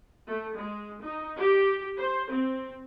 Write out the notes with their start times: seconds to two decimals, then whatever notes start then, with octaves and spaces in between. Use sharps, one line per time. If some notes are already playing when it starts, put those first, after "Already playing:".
0.26 A3
0.55 G#3
1.00 D#4
1.37 G4
1.98 C5
2.28 C4